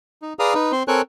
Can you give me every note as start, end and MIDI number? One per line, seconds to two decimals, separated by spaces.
0.22 0.33 63
0.39 0.54 68
0.39 0.54 71
0.39 0.54 74
0.39 0.54 77
0.39 0.54 82
0.39 0.54 87
0.54 0.72 63
0.54 0.72 71
0.72 0.83 60
0.72 0.83 72
0.88 1.02 60
0.88 1.02 69
0.88 1.02 70
0.88 1.02 73
0.88 1.02 80
0.88 1.02 90